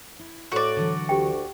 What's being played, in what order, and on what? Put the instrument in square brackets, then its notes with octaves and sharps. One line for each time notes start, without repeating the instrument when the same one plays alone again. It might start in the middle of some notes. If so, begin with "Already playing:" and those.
[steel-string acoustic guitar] E4
[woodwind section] A2 [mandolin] F#4 D5 [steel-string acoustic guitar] G5
[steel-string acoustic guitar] D3 E3 F#3
[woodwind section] D2 [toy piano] G4 G5